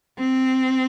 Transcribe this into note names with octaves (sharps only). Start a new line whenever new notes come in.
C4